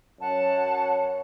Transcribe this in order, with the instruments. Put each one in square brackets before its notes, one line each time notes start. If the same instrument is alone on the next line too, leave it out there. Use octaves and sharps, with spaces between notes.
[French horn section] F#2 C#5 [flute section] F#5 A5